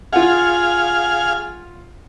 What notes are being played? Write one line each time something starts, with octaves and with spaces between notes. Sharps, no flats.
F4 G#4 F5 F#5